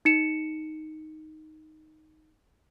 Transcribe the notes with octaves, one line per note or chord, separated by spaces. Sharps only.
D#4 C#7 E7